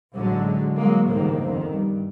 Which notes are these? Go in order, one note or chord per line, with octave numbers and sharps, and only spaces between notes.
A1 D3 F#3 G#3
F#3 G#3 A#3
G1 C#2 G#2 D#3 A#3
F2 D#3
G2